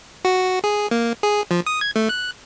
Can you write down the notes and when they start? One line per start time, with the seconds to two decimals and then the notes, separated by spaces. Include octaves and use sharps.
0.25 F#4
0.64 G#4
0.91 A#3
1.23 G#4
1.51 F3
1.66 D#6
1.81 G#6
1.96 A3
2.09 F#6